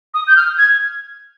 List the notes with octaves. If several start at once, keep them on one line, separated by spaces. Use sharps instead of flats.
D#6
G6
F6
G#6